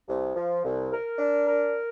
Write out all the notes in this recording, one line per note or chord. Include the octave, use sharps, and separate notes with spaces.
C2
F3
C2
A#4
D4
A#4